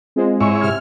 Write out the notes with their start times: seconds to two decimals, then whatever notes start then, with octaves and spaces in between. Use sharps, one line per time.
0.16 G#3 C4 F4 C5
0.40 G#2 E4 C#5 G#5 C6 C#6
0.61 C3 F6 G#6